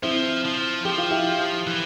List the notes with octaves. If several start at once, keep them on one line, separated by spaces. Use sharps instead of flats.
F3 C4 E4
F3
F3 G4
F4
E4 G4
E3